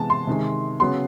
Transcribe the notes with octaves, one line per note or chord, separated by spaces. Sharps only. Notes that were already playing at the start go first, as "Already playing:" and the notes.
Already playing: C3 E3 G#3 B3 A5
C6
C3 D#3 G#3
C#3 F#3 B3 C6